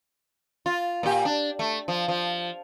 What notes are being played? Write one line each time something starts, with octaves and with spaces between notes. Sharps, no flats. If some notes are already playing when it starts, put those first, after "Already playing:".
F4
A#2 G4
D4
A3
F3
F3